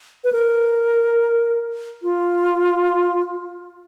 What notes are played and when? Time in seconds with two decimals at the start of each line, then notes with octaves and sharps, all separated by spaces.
0.24 B4
0.33 A#4
2.03 F4